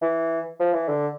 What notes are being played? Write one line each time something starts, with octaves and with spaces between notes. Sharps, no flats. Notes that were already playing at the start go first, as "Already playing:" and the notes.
E3
F3
E3
D3